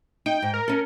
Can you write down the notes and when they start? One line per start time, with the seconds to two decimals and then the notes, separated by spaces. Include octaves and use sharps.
0.26 D#4 G5
0.42 G#2
0.54 A#4
0.68 C#4 A4